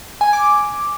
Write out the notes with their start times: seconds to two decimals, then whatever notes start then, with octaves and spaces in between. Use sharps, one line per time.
0.21 G#5
0.33 D6